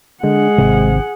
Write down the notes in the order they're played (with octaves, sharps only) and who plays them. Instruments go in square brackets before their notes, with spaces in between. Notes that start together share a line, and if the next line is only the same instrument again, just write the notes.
[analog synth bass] D3 [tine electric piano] G#3 [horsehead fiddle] G#4 F#5
[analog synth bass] G#1 [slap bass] C3